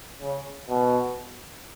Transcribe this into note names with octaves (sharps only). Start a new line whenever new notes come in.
C#3
B2